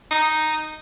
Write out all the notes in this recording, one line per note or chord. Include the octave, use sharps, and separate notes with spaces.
D#4